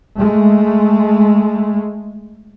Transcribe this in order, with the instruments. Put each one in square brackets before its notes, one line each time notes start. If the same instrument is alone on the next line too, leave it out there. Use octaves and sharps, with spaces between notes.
[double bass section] G#3 A3